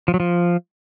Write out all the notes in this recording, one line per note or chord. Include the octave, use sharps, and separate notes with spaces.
F3
F#3
F3